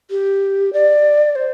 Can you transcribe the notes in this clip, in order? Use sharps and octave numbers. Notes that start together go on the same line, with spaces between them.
G4
D5
C5